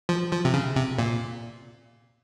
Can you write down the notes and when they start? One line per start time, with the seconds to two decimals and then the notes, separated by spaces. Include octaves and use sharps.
0.09 F3
0.32 F3
0.45 C3
0.54 C#3
0.76 C3
0.99 A#2